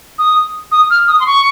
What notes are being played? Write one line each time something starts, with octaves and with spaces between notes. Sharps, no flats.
D#6
D#6
F6
D#6
C6
C#6